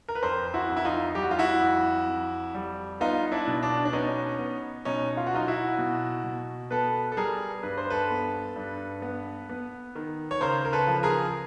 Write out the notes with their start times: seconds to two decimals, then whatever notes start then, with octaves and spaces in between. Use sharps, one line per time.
0.08 A#4
0.15 B4
0.22 F2 A#4 C5
0.54 E4 F#4
0.70 F2
0.77 E4
0.85 D#4 F4
1.15 G3 G4
1.23 F#4
1.31 F4
1.39 E4 F#4
1.62 F2
2.09 F2
2.54 G3
3.01 B3 D#4 F4
3.32 D4 E4
3.48 B2
3.63 D4
3.85 D4
3.93 B3 C#4 D#4
4.39 B3
4.85 B2 C#4 D#4
5.17 F4
5.27 F#4
5.33 F#3 D#4 F4
5.47 E4 F#4
5.78 B2
6.24 B2
6.71 B3 A4 B4
7.12 A4
7.17 G3 G#4 A#4
7.63 G2 B4
7.78 C5
7.90 A4 B4
8.11 B3
8.56 G2
9.02 B3
9.49 B3
9.95 D#3
10.31 C#5
10.41 C#3 A#4 C5
10.65 A#4
10.73 A4 B4
10.87 F3
11.03 G#4 A#4